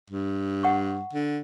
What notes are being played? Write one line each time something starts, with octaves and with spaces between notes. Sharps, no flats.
G2
F#5 C#6
D3